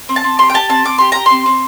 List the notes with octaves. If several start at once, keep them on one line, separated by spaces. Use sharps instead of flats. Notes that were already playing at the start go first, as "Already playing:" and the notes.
C4
A5
C4
G4 C6
G5
G4 A5
C4 A5
C4 D6
G4 C6
G4 A#5
C4 C6
C4